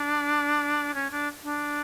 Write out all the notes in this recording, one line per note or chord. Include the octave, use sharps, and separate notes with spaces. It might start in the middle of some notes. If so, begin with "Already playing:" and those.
Already playing: D4
C#4
D4
D4